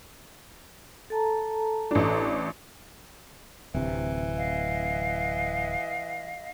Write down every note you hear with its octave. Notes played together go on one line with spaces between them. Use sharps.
A4 A5 A#5
A1 D4
D1 C3 E3
D#5 F5 F#5